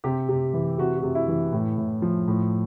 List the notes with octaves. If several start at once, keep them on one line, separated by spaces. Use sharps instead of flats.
C3 G4
C3
E3
C3 F#4
F#4
C3
E4
E3
A2
A2
F3
A2